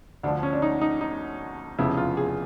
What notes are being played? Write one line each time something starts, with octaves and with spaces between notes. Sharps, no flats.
D2 D3 F3 D4
C#4
D4
D#4
D#4
D#4
F1 E2 C#3 F3 E4
F4
G#4